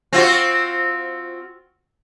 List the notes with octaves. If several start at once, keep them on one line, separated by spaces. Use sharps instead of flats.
C4 F4 F#4